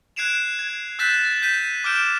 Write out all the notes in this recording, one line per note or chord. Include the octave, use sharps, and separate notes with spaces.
F#6 G#6 C7 D7 E7 F7
G#6
E6 F#6 G6 A6 B6 E7
A6
G6 B6 D#7
D6 E6 F6 G6 D7 E7